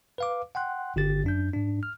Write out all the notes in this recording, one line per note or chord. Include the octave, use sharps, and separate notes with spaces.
B4 F5 D6
F#5 G5 C6 F#6
G1 D3 G4 A6
F#2 D4 G6
G#2 D4
F6